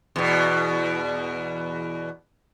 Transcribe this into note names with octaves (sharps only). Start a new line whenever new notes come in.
E2 B2